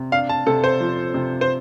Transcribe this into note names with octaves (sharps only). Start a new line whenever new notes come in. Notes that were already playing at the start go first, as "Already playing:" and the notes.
Already playing: C3
D4 F5
A5
C3 A4
C5
F3
C3
C5